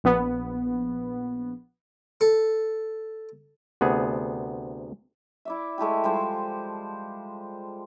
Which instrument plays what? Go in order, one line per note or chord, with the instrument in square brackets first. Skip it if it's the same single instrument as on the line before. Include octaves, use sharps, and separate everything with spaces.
[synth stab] A#1 B3
[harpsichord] A4
[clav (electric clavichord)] D2 C3 B3 G#4
[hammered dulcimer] E4 D5 E5
G#3 A3 E4 G4
F3 G3 G#3 C5